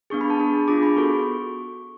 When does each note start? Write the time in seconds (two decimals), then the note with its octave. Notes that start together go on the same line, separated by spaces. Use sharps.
0.10 B3 D4 G#4 C#6
0.21 B5
0.30 A5
0.40 D4 G#4
0.68 D4 F4 G#4 D6
0.83 B5
0.97 B3 F#4 A4 C#6